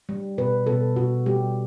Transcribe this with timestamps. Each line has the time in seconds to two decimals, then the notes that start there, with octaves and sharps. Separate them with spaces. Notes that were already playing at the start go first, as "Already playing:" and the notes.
0.09 G3
0.38 B2 B4
0.67 B2 A4
0.96 B2 F#4
1.26 G3 G4